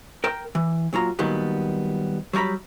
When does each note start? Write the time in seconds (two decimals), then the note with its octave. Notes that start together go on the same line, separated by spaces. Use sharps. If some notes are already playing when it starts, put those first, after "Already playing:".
0.24 A#4 G5
0.55 E3
0.93 A#2 F#3 F4 A#5
1.19 A#2 D#3 F#3 G3 B3
2.33 F#3 G3 C#5 A#5 B5